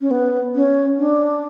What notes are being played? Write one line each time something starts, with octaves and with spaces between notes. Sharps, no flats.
C#4
B3
C#4
D4